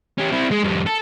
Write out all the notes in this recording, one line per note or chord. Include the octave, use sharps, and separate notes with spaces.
C#4 G4
C4 E4
G#3
F2 G3
A4